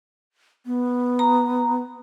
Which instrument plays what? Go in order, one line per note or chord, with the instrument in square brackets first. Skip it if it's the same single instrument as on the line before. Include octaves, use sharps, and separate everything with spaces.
[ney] B3
[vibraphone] A#5